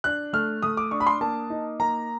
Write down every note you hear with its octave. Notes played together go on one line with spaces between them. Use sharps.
D4 F#6
A3 F6
A3 D#6
D6
D4 C#6
B5
C6
A#3 A5
D#4
A#3 A#5